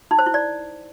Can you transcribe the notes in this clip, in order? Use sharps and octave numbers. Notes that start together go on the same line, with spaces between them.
D#4
C5
E4
D5